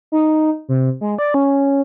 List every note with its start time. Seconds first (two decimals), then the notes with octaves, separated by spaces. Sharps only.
0.12 D#4
0.69 C3
1.01 G#3
1.18 D5
1.34 C#4